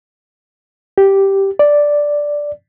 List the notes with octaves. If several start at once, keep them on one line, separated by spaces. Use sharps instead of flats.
G4
D5